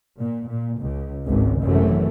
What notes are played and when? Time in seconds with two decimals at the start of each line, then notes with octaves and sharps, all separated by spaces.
0.18 A#2
0.49 A#2
0.80 C#2
1.26 G#1 C#2
1.62 G#1 F#2 C3 E3 F#3 A3